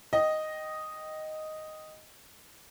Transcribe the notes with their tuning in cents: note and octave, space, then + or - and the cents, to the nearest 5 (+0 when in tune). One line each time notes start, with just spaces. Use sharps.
D#5 +0 G5 -20